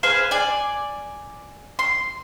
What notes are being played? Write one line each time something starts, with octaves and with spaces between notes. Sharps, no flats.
G#4 B4 C5 F5
D5 G#5
C6